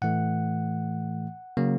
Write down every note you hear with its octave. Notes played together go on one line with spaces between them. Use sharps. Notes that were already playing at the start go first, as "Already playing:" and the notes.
A2 E3 A3 F#5
C#3 F#3 A#3